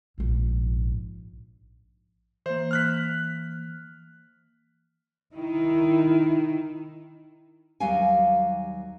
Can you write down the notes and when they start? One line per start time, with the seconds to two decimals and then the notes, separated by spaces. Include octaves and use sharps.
0.18 A#1 G#2
2.46 E3 A#3 C5
2.71 F6 F#6 B6
5.35 D#3 E4
7.80 D#2 F#3 G3 F5 G#5